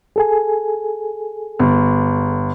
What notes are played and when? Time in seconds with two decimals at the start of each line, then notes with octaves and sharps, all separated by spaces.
0.16 G#4 A4 G#5
1.59 G1